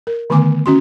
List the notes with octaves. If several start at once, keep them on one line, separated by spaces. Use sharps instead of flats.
A#4
D3 D#3 A3 B3 G#5 D6
C#4 F#4 C6